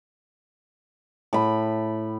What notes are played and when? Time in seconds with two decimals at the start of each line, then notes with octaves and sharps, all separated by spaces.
1.33 A2 B5